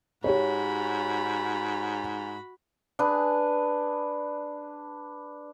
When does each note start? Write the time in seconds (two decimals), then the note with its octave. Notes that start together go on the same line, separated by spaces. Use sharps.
0.24 G#2 F#4 G4 C#5 B5
2.99 D4 G#4 B4